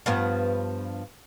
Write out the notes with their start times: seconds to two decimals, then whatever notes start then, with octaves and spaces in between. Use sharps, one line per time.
0.06 G2 F3 B3